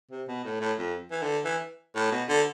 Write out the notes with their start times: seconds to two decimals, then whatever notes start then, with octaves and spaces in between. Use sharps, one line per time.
0.11 C3
0.28 B2
0.44 A2
0.61 A2
0.78 F2
1.12 E3
1.22 D3
1.45 E3
1.96 A2
2.12 B2
2.29 D3